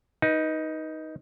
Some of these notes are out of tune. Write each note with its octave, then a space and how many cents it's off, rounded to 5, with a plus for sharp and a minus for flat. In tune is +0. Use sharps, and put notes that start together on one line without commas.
D#4 +10 B4 -25